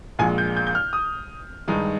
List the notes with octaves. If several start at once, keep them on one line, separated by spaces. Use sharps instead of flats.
A#1 A#2 G#3 G#5
G6
G6
G6
F6
D#6
G2 D#3 G#3 D#4